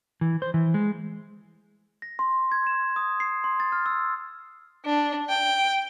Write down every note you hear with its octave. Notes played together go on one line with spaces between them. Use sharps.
E3
C5
E3
G#3
A#6
C6
G#6
E7
D#6
C7
C6
A6
F6
E6
D4
G5